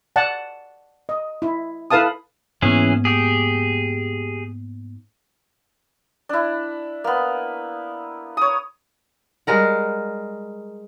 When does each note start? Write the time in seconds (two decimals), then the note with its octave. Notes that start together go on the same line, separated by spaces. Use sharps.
0.16 D5 F#5 A5
1.09 D#5
1.42 E4
1.90 E4 A4 B4 F5 A5 D#6
2.62 G#2 E3 A#3 B3 C#4 G#4
3.05 G4 G#4
6.29 D4 E4
7.04 A#3 B3
8.37 C#5 D#6
9.47 G3 G#3 A#4 F#5